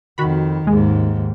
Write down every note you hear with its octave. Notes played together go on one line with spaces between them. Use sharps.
F2 D#3 F#4 B5
D#2 G#2 G#3